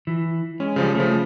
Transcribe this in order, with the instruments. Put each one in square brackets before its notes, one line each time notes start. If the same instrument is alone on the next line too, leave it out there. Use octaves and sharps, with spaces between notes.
[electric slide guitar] E3
[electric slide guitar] G#3 [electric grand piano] C#4
[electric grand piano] C#3 F3 G3
[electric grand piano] C#3 F3 [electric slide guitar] A3